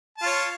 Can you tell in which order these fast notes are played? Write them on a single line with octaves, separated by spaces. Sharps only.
A5 F4 C#5